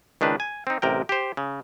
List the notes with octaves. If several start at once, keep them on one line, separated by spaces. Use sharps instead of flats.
C#2 D#3 D4 B4
G#5
C4 D#4
A1 C3 A#4 G5
G4 C5
C#3